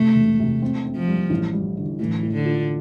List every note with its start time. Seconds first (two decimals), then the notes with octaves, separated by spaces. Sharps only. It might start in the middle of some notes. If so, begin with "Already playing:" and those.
Already playing: C3 A3
0.15 E1
0.39 C3
0.62 C4
0.85 C4
0.96 F3
1.08 G3
1.30 A1
1.53 G3
1.77 D3
2.00 A2 E3
2.23 A2
2.34 D3
2.45 F4